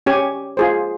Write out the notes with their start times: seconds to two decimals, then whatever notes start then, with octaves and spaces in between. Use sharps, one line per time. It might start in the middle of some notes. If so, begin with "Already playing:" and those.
0.06 C#4 G4 C#5 G#5
0.57 F4 G#4 C5